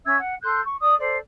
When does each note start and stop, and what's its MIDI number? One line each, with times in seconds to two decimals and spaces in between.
0.05 0.17 61
0.05 0.17 76
0.05 0.17 88
0.05 0.17 92
0.18 0.34 78
0.42 0.60 69
0.42 0.60 84
0.42 0.60 90
0.42 0.60 91
0.63 0.76 85
0.80 0.95 74
0.80 0.95 87
0.98 1.17 69
0.98 1.17 72
0.98 1.17 74